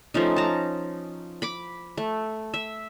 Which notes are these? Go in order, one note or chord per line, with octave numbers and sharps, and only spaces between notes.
F3 A3 C#4 D#4
A5 A#5
B5 D6
A3
E5